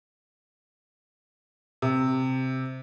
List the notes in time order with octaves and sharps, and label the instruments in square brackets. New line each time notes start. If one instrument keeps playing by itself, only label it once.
[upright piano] C3